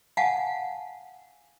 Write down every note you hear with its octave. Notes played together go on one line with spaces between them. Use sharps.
F5 F#5 G#5 A5